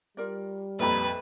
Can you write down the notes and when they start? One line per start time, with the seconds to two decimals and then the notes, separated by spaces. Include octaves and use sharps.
0.17 G3 F4 A#4 D5
0.79 A#1 F2 A4 B4 A#5 B5